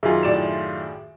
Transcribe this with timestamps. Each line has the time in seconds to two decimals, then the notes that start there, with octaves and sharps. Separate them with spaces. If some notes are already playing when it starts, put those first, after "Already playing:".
0.03 F#2 D#3 F4 F#4 G#4 E5 G#5
0.23 A2 D5 E7